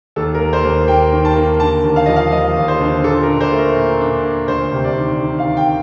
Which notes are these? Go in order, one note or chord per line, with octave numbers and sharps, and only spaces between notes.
D#2 A4
A#4
A#3
C5
D#2
A#3 G5
D#3
A5
A#3
D3 A5
D#2
F5
F3 D#5
F5
F3 D#5
D#2
C5
D3
A#2 A4
A#4
D4
C5
A3
A#4
A#2
D4
A#2
D2 C5
C3
D5
D#3
D#3
F5
D#3
G5